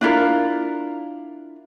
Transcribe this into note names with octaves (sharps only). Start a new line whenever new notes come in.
D4 E4 F4 A#4